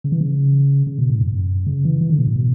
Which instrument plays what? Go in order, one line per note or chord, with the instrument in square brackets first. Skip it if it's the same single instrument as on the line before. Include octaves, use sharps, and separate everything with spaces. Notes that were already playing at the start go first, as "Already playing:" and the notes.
[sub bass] C#3
E3
C#3
C#3
B2
A2
F#2
F#2
C#3
E3
E3
D3
B2
A2
B2